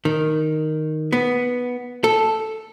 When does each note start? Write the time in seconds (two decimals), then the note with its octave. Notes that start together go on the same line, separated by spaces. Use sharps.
0.05 D#3
1.12 B3
2.04 A4